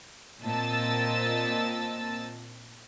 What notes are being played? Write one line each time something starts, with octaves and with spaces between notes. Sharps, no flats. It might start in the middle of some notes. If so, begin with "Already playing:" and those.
A#2 C4 D#5 A5 E6 A6